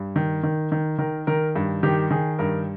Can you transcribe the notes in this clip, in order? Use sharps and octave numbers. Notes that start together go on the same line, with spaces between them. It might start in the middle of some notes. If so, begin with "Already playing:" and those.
Already playing: G2
D#3
D#3
D#3
D#3 A#4
D#3 A#4
G2
D#3 G4
D#3 G#4
G2 A#4